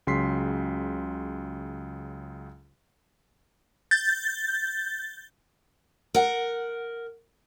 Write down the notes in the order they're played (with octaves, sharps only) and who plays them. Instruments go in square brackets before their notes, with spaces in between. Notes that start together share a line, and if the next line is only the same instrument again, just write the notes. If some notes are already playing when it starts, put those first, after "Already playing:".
[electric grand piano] C#2 C#3 F#3 C6 B6 C7
[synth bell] G6 A6
[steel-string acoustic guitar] A#4 F#5